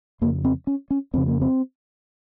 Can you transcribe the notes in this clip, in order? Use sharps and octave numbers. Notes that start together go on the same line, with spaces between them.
F2 C#3 A#3
C4
C#4
C#4
F2 C#3 C4
A#3
C4